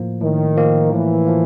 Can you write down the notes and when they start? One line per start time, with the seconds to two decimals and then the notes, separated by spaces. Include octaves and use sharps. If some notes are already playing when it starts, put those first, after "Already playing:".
Already playing: A2 F3 A#3
0.21 A2 D#3
0.57 F3 A#3
0.92 A2 E3
1.27 F3 A#3